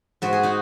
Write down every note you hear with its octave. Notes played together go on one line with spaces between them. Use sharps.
G#2 F#4
G#4
D#4 F#4